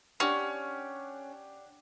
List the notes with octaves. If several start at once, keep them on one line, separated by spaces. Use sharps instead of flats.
C#4 D4 G4 F#5